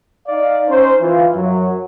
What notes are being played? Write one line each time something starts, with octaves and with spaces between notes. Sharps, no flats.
D#4 D5 F5
C#4 D#4 C5
E3 F4
F#2 F#3